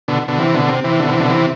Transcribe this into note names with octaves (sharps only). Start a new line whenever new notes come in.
B2 D3
B2 D3
C3 E3
B2 D3
C3
C3 E3
B2 D3
C3 E3
B2 D3
C3 E3